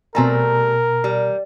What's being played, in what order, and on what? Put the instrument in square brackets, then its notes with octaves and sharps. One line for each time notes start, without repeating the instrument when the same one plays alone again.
[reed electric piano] B2 G#5 A#5 [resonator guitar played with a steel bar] G3 A3 C4 [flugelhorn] A#4
[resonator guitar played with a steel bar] G3